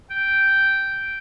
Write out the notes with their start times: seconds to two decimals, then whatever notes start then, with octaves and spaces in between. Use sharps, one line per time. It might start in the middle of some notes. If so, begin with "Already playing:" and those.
0.10 G5